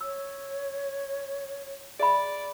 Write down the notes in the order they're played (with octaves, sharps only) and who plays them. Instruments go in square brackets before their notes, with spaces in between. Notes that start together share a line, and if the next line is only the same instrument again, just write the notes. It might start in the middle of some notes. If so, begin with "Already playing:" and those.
[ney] C#5 [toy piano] E6
[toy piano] G#4 E5 B5 [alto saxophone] D5